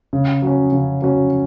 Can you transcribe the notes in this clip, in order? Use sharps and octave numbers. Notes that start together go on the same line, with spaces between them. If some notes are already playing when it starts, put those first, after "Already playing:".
C#3
F#3 C#4
C#3
F#3 C#4